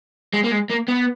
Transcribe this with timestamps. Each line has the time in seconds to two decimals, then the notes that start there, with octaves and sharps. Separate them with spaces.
0.33 G#3
0.44 A#3
0.52 G#3
0.71 A#3
0.88 B3